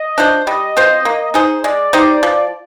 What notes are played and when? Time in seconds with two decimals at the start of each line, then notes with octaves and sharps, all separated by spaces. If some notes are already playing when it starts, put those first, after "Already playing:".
Already playing: D#5
0.18 D4 F4 C5
0.47 G3 D#5
0.77 C4 F4 C5
1.05 A#3
1.34 D#4 G#4 C5
1.63 G#3 D5
1.93 D#4 G4 C5
2.23 F3